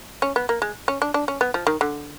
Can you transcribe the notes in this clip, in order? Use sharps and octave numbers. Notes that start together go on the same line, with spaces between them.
C#4
B3
A#3
G#3
C#4
D4
D4
C#4
B3
F3
D#3
D3